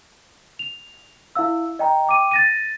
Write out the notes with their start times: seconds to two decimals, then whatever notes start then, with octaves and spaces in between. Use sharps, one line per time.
0.59 F7
1.35 E4 E5 F5 E6
1.79 D#5 G5 A#5
2.07 G5 D6 D#7
2.31 A6 A#6 D#7